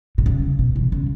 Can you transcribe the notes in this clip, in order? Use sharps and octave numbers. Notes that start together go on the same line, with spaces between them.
B2
C#3
B2
E3
C#3